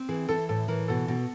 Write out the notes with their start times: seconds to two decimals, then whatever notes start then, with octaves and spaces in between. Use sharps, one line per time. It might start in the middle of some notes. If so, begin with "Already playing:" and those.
Already playing: C4
0.09 E3 G#4
0.29 E3 A4
0.49 A2 A4
0.68 E3 A#4
0.88 B2 A4
1.08 B2